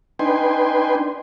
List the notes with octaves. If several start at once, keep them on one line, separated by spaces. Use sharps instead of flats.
D4 D#4 B4 G5 G#5 C6